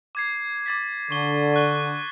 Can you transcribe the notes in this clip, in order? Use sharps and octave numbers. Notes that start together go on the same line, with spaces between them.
D6 G#6 C7
D6 A6 B6
D3 C#6 G7
C#6 F#6 G7